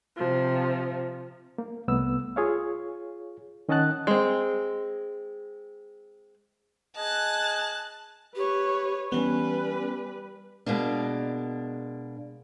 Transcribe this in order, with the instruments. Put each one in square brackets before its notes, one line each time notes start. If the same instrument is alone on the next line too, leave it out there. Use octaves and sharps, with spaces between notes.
[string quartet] C3 F3
[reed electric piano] A#3
C2 A3 B3 E6
F4 G#4 C#5 F5
D#3 C#4 D#5 F#5 A5 F#6
[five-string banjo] G#3 C4
[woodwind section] G#4 D#5 G#5 [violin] A5 F#6
[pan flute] G4 [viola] B4 C#5
[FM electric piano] E3 B3 [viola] G3 B4 [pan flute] C#4
[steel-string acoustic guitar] B2 G#3 A#3 D4